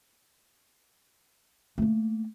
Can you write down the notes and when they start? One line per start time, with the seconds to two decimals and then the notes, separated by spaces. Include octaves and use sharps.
1.78 A3 A#3